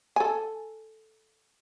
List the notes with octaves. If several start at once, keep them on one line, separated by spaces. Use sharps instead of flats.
A4 G#5